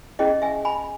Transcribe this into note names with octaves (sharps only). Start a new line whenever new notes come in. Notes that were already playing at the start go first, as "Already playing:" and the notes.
C#4 E4 G#4 D#5 G5
E5 G#5
G#5 B5